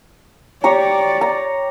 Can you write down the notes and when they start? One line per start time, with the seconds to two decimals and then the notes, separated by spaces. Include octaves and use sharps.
0.64 G4 C#5 D5 A#5
1.21 A#5